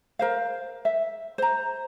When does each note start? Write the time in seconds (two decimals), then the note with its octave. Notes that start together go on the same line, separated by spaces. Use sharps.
0.19 A#4 C5 F5
0.85 E5
1.38 C5 A#5